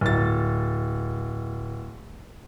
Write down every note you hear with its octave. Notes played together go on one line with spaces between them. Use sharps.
D1 A6